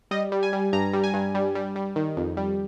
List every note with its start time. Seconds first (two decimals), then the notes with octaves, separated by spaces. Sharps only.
0.11 G3 D#5
0.32 G3
0.43 G#5
0.53 G3
0.73 G2 A#5
0.93 G3
1.04 G#5
1.14 G2
1.35 G3
1.55 G3
1.76 G3
1.96 D#3
2.17 F2
2.37 G3